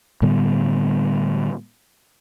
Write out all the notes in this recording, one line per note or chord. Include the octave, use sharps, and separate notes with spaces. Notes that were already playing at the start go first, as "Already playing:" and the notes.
A2 D3 G3 B3